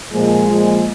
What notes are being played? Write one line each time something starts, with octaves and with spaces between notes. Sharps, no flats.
A#2 F3 G#3
A#2 F3